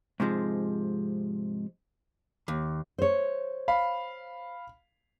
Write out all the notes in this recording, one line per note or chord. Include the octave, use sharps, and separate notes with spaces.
G#2 C3 F3 G#3
D#2
C5 C#5
F5 B5